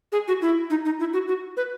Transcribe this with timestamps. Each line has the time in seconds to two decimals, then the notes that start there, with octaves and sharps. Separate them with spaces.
0.12 G#4
0.28 F#4
0.42 E4
0.70 D#4
0.85 D#4
1.00 E4
1.13 F#4
1.28 F#4
1.57 B4